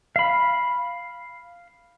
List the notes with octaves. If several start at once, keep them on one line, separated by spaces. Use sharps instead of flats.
F5 B5